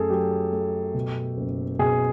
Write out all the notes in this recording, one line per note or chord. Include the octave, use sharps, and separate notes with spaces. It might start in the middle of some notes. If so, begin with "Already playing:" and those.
Already playing: F#2 A3 G#4 A4
F#3 G4
A3
B2
F#1
B2 G#4